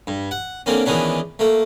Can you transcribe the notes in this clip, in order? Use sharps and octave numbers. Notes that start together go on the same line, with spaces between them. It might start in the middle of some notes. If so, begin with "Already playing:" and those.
G2
F#5
D3 A#3 C4 C#4
D#3 E3 G#3 B3 C#4 D4
A3 A#3